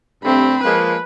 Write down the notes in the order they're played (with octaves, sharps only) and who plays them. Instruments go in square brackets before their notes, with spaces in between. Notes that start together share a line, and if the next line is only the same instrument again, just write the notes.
[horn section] G2 C3 A3 [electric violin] C4 B5
[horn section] F3 G#3 A#3 [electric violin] B4